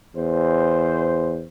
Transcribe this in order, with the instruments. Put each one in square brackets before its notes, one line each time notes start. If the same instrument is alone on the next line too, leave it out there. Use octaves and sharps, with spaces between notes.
[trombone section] E2 C5